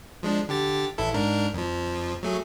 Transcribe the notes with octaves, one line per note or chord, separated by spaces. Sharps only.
F3 G#3 D4
D3 G4 A6
A1 E4 A4
G#2 D4 A#4
F2 F3
F#3 A3 G#4